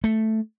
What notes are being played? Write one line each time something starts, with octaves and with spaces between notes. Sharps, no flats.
A3